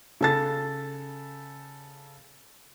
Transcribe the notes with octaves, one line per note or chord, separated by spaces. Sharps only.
C#3 A4 A6